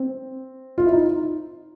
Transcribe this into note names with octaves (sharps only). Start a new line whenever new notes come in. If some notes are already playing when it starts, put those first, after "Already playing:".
Already playing: C4
F4
E4
D#4